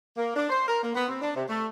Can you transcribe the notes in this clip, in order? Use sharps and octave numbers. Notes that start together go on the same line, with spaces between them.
A#3
D4
C5
A#4
A#3
B3
C4
D4
C3
A3